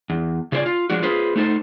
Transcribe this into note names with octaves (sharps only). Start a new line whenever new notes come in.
E2
C#3 F4 G4 C5 D5 G#5
F4
F3 G#3 D4 F#4
F4 G#4 B4 C5
A3 D#4 A4 C5